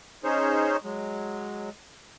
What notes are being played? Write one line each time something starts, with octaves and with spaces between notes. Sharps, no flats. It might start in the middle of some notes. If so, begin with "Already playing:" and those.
C#4 D#4 G#4 C5 C#5
F#3 G#3